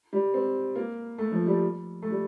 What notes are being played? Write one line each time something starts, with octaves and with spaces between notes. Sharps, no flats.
G3
C4
A#3
A3
F3
G3
A3
G3